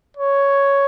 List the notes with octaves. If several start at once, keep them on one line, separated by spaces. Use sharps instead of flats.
C#5